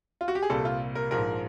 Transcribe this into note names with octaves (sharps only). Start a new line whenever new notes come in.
F4
F#4
G4
G#4
C2 A#2 G3 C4 A4
F4
A#4
A#1 G#2 F3 A#4